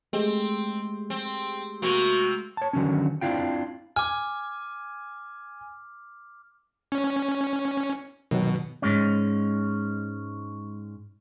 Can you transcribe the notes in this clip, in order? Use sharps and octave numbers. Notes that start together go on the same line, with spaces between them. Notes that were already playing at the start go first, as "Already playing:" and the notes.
G#3 A3 C4 G4
C4
C3 A#3 F#4
C#5 A5
D3 D#3 F#3 C#4
C4 D4 E4 F4 G5
G#5 D6 F6
C#4
B2 D#3 F#3
G#2 G#3 C#4